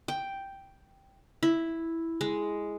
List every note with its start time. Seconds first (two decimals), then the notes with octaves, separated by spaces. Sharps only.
0.08 G5
1.43 E4
2.21 G#3